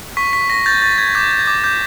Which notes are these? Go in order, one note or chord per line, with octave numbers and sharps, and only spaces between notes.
C#6 B6
C#6 B6
C#6 A#6
G6 A6
C#6 A6
C#6 G#6
D6 G6
G6
G#6
D6
D6 G6